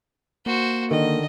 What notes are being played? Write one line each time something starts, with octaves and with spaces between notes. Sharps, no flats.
A#3 F#4 C5
D3 D#3 D#5